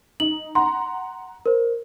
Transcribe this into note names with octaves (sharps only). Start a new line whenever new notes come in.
D#4 F#7
F#5 A#5 C6
A#4 C5